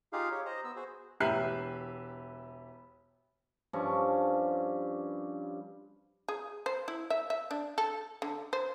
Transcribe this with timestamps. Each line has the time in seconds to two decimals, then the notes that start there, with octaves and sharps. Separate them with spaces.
0.13 D#4 F4 G4 G#4 F5
0.31 G4 C#5
0.46 C5 D#5 A#5
0.64 B3 E6
0.76 F#4 G#4 C5
1.20 E1 G4 B4 E5 F#6 C7
3.73 G2 F3 C#4 C#6
6.29 G#4
6.66 C5
6.88 E4
7.10 E5
7.30 E5
7.51 D4
7.78 A4
8.22 D3
8.53 C5